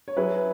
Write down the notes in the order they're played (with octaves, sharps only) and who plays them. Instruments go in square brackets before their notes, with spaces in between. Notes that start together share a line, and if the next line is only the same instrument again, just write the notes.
[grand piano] C#5
F#3 C#4 E4 G#4 B4